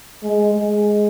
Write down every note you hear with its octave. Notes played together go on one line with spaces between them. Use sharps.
G#3
G#3